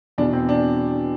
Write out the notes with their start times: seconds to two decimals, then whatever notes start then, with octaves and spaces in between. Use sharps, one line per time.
0.18 E2 B2 D4
0.33 C4
0.49 D4